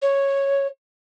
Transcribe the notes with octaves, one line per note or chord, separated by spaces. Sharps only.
C#5